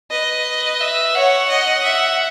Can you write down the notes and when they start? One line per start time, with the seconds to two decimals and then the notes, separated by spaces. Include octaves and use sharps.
0.10 B4 D#5
0.80 E5
1.14 C#5 F#5
1.49 D#5
1.83 E5